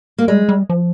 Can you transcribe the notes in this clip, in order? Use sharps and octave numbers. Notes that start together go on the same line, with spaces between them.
A#3
G3 G#3
G3
F3